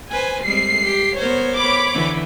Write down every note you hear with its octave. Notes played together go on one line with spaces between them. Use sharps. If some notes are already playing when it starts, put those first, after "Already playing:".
B4 C5 G#5
G3 G#3 C4 C7
G4
B3 A#4 C5 C#5
C#5 B5 D6
D3 E3